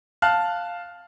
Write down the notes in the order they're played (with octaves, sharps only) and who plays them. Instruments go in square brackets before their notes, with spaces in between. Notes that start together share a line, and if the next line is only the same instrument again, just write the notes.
[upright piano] F5 A5 F6 F#6